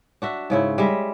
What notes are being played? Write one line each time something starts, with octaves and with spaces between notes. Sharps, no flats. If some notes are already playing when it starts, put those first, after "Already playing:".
D4 F#4 E5
G#2 C#3 E4
G3 G#3 E5